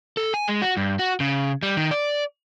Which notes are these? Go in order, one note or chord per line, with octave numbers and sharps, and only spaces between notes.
A4
G#5
G#3
F#4
G2
F#4
C#3
G3
D#3
D5